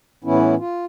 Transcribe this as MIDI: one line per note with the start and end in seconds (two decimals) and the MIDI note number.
0.24 0.55 45
0.24 0.55 52
0.24 0.55 59
0.24 0.55 61
0.24 0.55 64
0.58 0.85 65